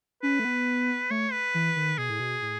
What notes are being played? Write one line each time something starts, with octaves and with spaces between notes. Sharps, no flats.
C#4 B4
A3
B3
A3 C#5
B4
E3
D#3
B2 G#4
A2
B2
A2